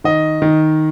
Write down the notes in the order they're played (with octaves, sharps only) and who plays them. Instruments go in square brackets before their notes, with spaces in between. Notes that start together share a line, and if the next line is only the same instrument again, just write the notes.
[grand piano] D#3 D#5
D#3